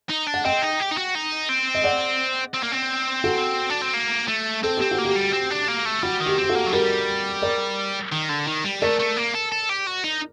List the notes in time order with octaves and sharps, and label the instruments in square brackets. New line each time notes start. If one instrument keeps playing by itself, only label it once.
[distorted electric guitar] D#4
D4
[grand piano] F#5
[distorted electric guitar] C4 [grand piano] D#5 G5
[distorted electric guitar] D#4
G4
D#4
F#4
D#4
C4
[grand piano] D#5
D5 F#5
[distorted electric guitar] C4
A#3
C4
[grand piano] F#4 A4
[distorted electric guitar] D4
C4
A#3
A3
[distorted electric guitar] C4 [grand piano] A4
[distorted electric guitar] C4 [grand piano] G4
[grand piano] F#4
[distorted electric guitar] A#3
[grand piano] G4
[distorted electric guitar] G3
C4
D4
A#3
A3
[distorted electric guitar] G3 [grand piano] F#4
[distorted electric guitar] D#3
[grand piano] G4
[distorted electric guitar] C4 [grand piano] G4
[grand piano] F#4 A4
[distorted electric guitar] A#3
F#3
[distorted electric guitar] G3 [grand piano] G4 A#4
[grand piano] A#4 D5
[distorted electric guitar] D#3
D3
D#3
G3
[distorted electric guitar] A3 [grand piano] A#4 D5
[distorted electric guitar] A3
A#3
A4
A4
G4
F#4
D#4